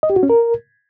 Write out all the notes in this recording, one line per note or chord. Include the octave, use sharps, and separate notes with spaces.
D#5
G4
F#4
C#4
A#4